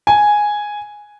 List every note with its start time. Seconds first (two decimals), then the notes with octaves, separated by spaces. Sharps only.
0.07 G#5